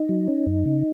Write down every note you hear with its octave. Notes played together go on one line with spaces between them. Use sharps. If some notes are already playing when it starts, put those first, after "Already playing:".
Already playing: D#4
F#3
C#4
F#2
C#3